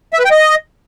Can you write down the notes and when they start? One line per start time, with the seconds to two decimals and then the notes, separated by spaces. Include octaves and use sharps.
0.13 E5
0.19 B4
0.25 G5
0.31 D#5